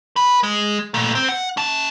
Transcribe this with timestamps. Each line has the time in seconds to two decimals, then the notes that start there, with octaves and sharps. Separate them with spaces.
0.16 B4
0.43 G#3
0.94 A#2 A3
1.15 C4
1.29 F#5
1.57 C#4 A5